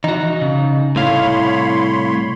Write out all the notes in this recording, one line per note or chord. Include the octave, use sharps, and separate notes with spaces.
E3 D#4 F#4
C#3
C2 A2 C#5 F5 B5 C6